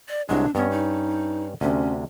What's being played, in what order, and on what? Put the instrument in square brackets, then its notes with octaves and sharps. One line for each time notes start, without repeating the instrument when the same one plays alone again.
[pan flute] D5
[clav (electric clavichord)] C2 F#3 G#3 [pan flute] D4
[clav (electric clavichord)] G2 C#4 [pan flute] B3
[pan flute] D#4
[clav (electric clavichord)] D2 C3 [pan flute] C#4